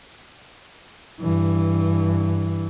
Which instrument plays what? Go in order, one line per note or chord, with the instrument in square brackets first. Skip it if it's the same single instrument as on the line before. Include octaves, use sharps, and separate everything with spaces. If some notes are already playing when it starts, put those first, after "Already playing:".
[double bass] G2 E3